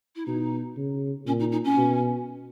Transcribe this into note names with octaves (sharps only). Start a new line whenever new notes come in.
E4
B2 D#4
C#3
A#2 C#4
D#4
D#4
C#4
B2